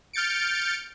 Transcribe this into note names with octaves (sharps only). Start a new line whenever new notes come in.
F6 G6 A6 C#7 D7